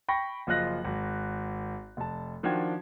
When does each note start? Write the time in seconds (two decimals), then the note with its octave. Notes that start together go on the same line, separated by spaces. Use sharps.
0.09 G5 B5 C#6 A#6
0.47 F#1 F3 F4 D#5 F#6 A#6
0.84 G#1
1.97 F1 A5
2.43 D#3 F3 D4 F#4 G5 G#6